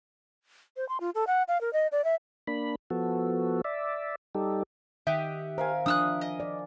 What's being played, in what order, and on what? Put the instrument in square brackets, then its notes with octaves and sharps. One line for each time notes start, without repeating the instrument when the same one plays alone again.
[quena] C5
C6
F4
A4
F#5
F5
A#4
D#5
D5
E5
[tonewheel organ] A#3 D4 B5
F3 B3 F#4 A4
D5 E5
G3 D#4 G4 A4
[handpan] D#3 [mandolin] G4 D#5 [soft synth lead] E5 [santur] F#5
[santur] A#4 F5 G#5 [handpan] C5
[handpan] F3 D4 [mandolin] D#6 E6 F#6
[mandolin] D#5
[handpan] D5